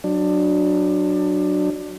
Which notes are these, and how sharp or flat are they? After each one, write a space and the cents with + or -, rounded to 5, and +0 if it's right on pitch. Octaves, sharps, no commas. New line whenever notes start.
F#3 +0 D4 +20